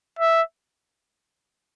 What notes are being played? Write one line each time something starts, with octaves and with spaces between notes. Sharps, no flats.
E5